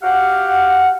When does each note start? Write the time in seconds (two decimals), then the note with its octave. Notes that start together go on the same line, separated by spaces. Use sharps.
0.03 F#4 G4 F5 F#5